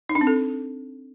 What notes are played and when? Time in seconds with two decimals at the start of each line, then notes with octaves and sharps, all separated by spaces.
0.09 D#4
0.15 D4
0.21 C4
0.27 A4